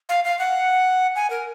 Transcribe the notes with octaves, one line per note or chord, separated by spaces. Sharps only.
F5
F5
F#5
G#5
A#4